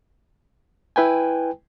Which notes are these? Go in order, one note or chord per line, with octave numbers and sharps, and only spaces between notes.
E4 B4 G5 G#5